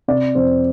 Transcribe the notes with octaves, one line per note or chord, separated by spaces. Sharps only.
C3 D5
F2 C5